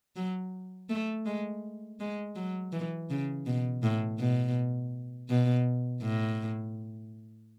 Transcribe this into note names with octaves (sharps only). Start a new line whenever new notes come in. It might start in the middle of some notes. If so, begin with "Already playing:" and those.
F#3
A3
G#3
G#3
F#3
E3
C#3
B2
A2
B2
B2
A2